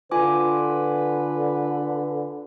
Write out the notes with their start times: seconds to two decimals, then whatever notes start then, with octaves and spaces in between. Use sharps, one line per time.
0.11 D3 F4 B4 G#5 D6